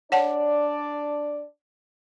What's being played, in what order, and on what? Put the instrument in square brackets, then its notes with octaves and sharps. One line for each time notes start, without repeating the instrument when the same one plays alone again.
[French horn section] D4 D5 [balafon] C#5 F#5 A5